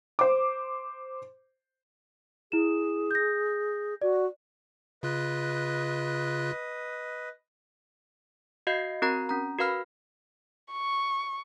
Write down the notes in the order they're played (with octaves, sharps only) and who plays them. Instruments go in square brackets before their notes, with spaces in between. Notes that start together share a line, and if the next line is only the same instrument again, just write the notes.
[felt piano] C5 D6
[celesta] E4 E7 [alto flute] G#4
[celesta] G6 A#6
[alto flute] F#4 [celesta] D5
[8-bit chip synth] C#3 F4 F#6 [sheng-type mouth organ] B4 D#5
[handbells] F#4 D#5 F5 G6 C7
C4 F#4 A#4 A#5
C#4 A#5
F#4 A#4 B4 F5 B5 F6
[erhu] C#6